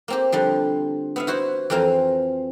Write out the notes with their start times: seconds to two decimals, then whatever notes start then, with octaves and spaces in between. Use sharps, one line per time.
0.08 A#3 C4 G4
0.32 D3 F3 G3
1.16 B3 E5 F5
1.27 E4 F#4 C5
1.70 F2 E3 C4 A#4 F5